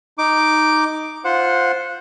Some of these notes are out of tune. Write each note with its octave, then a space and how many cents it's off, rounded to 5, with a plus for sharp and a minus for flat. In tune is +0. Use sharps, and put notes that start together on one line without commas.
D#4 +0 D6 +0
F4 +0 C5 +0 F#5 -15